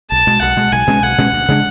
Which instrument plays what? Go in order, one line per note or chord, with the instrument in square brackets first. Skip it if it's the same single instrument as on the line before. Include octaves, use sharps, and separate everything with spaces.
[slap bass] B1 [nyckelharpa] A5
[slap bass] B2 G#3
[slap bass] B1 [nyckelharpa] F#5
[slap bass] B2 G#3
[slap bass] B1 [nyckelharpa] G#5
[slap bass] B2 G#3 C#4
[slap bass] B1 [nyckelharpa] F#5
[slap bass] B2 G#3 C#4
D2
C#3 G#3 D4